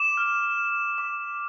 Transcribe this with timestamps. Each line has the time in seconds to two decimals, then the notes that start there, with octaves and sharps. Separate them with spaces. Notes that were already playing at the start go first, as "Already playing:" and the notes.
Already playing: D6 E7
0.17 F6
0.57 F6
0.98 D6